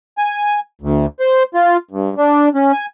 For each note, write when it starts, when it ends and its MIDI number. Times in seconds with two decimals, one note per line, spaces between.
0.18 0.60 80
0.82 1.06 38
1.20 1.43 72
1.54 1.77 65
1.91 2.14 43
2.17 2.49 62
2.55 2.72 61
2.72 2.86 80